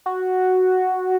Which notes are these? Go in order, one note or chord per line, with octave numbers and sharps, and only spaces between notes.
F#4